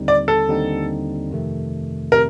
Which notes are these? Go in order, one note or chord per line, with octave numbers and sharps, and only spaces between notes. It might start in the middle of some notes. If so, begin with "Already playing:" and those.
Already playing: D#2 D3 G3 C4 D#4
D5
A4
D#2 D3 G3 C4 D#4
F2 C3 D#3 A3
C3 A#4